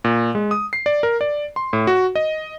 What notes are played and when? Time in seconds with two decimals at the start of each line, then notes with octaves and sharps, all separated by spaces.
0.04 A#2
0.35 G#3
0.51 D#6
0.73 C7
0.86 D5
1.03 A#4
1.21 D5
1.56 C6
1.73 A2
1.87 F#4
2.15 D#5